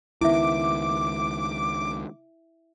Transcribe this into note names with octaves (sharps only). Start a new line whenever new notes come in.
C#2 D#3 B3 E4 E5 D6